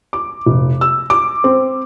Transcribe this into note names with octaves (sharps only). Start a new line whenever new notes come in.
D6
F1
E6
D6
C4